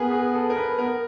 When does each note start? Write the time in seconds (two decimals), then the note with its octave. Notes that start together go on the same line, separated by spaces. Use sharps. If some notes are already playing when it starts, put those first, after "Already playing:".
Already playing: B3 G#4 A#4 B4
0.12 G#4
0.35 A4
0.50 A#4
0.56 B4
0.79 B3 A#4